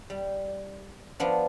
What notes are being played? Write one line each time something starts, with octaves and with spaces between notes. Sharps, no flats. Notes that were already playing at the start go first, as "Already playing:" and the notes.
G3
F3 B3 D4 F4